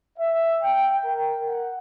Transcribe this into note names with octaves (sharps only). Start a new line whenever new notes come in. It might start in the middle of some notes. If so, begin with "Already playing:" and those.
E5
G5
A#4
F#5